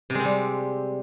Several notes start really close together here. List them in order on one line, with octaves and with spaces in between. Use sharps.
C3 G#3 C4 G3